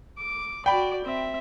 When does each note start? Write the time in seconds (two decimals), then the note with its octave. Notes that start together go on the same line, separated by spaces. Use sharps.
0.18 D6
0.66 F#4 D5 G5 B5
1.04 C4 E5